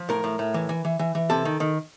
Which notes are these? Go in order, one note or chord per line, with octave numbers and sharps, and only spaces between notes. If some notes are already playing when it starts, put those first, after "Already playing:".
Already playing: F3
A2 A#4
A2
A2
E3
E3
E3
E3
E3
C3 A4
D#3
D#3